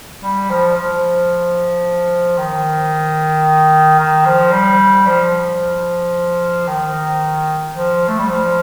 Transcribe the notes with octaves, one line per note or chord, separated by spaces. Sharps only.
G3
F3
F3
D#3
D#3
F3
G3
F3
D#3
F3
A3
G3
F3